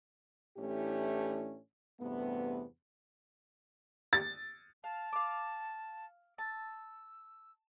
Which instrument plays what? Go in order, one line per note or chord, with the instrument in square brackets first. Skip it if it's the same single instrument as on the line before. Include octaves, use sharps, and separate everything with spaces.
[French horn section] A2 E3 A3 C#4 D4 G4
E2 G2 C3 A3 B3
[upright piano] A6
[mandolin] F5 [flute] A5
[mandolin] F5 D6
[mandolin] A5 [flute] E6